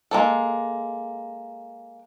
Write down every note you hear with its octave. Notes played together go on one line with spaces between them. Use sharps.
G#3 A#3 A4